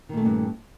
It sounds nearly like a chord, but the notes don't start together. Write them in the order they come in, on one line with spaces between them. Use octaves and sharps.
D#3 A#2 A3 C#4 G2